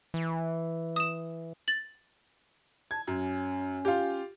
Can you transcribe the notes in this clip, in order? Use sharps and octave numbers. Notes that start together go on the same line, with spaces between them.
E3
D#6 E7
A6 F#7
A5 G#6
F#2 C#4
F4 G4